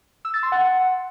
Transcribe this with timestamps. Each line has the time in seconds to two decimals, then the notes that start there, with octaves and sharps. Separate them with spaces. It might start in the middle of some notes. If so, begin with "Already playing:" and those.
0.25 E6
0.34 A6
0.43 C6
0.52 F#5